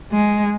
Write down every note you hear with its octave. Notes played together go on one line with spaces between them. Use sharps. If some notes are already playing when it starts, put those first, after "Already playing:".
G#3